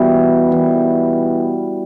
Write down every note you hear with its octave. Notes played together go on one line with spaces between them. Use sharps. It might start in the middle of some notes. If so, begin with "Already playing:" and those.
Already playing: B2 E3 G3
E3